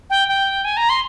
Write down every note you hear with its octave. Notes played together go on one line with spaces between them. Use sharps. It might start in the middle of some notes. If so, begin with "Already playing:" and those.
G5
G5
G#5
A#5
C6